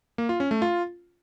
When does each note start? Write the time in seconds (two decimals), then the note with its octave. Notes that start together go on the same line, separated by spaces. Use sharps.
0.18 A#3
0.29 F4
0.40 C#4
0.51 A3
0.62 F4